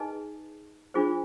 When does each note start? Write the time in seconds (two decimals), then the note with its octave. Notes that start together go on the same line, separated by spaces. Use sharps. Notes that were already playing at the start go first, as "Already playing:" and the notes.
Already playing: D#4 G#4 B4 D#5 G#5
0.94 D4 F4 G#4 C5